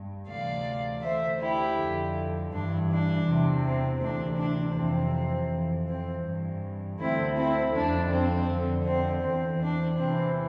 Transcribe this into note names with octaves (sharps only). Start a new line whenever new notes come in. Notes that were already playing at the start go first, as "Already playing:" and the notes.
Already playing: G2
D2 C3 E3 D5 F5
D2 D3 C5 E5
E4 G4
F2 D3
G2 E3 D4
D4
E2 C3 E3
C4
D2 C3 E3 D4
D4
F2 C3 E3 C4
F2 E3
C4
G2 E3
D2 D3 C4 E4
C4 E4
F2 D3 D4
C4
F2 D3
C4
E2 E3 C4
D4
E2 C3 E3 C4